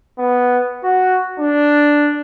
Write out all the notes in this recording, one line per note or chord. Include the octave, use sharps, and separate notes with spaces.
B3
F#4
D4